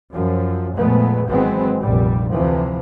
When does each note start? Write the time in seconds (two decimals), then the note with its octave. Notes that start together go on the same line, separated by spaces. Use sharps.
0.13 F#2 F3
0.76 F2 A#2 G#3 A3 B3
1.27 G#1 E3 F#3 G#3 B3 C4
1.81 F1 A#1 A#2 G3
2.31 D2 C3 E3 F3